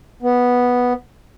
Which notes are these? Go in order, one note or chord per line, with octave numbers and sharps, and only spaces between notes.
B3